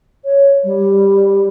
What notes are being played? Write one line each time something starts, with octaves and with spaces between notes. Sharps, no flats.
C#5
G3